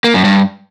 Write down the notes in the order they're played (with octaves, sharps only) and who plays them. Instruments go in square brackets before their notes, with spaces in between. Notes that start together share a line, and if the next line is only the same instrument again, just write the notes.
[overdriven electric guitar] A#3
F#2
G2